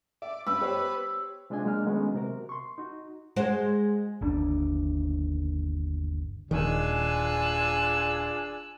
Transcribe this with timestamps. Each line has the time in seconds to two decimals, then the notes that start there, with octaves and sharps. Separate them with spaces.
0.22 D5 E5
0.46 G2 B3 B4 E6
0.61 G4 C5 C#5
1.50 C3 G#3 D4 F4 D#5 G#5
1.64 F#3 G#3 A#3 D4 F6
1.85 D#3 F#3 G#3 A3 B3 C#4
2.15 C3 F#4 A#4
2.49 C6 C#6
2.78 D#4 F#4
3.36 G#3 F#4 C5
4.21 G1 D#2 D4
6.51 D#1 D#3 D4 F4 G#4 G#5 E6 F#6